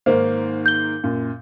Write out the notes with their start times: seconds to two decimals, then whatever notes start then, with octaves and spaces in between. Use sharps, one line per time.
0.06 G#2 D#3 A#3 C5
0.66 G6 G7
1.04 F#2 A#2